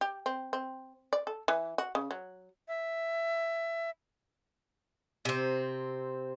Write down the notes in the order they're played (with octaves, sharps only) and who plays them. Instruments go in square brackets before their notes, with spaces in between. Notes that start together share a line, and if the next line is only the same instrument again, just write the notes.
[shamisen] G4
C4
C4
D5
A4
E3
F#4
C#3
F#3
[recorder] E5
[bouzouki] C3 C4